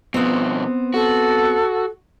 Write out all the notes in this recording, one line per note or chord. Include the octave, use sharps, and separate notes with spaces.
B2 F3 B3 C4
F#4 A4